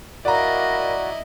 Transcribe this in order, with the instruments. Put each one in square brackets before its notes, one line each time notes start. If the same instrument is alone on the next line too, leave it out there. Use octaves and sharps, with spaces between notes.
[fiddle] E4 D#5 [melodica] F#4 [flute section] A#4 F5 B5 [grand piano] D5 A#5